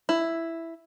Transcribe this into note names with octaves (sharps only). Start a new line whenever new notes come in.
E4